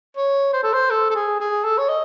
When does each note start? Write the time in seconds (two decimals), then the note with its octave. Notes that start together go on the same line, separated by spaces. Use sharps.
0.17 C#5
0.53 C5
0.63 A4
0.73 C5
0.90 A4
1.11 A4
1.15 G#4
1.40 G#4
1.65 A4
1.78 C#5
1.89 D#5